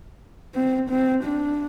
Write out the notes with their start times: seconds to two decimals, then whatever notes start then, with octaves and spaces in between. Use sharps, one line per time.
0.55 C4
0.90 C4
1.24 D4